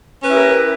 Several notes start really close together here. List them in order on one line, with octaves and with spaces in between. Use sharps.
C#4 B4 E4 G4 A#4